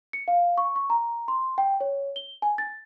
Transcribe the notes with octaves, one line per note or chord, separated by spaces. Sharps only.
C#7
F5
C#6
C#6
A#5
C6
G5
C#5
G7
G#5
A6